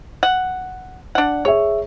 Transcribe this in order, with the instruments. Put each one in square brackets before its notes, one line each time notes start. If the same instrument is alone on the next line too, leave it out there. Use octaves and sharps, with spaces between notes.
[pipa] F#5
D4 F#5
[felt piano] G#4 E5 [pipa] C#5